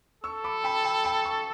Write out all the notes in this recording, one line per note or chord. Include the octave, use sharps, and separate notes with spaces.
A4 C#6 E6
B5 D6
G5 B5
G5 B5
G5 B5
A5 C#6